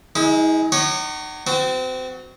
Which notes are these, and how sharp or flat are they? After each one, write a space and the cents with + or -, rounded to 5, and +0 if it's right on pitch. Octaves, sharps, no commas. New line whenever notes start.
G#3 +0 E4 -45
D#4 -35 F#4 +40 C#5 -10
C4 -30 F#4 +0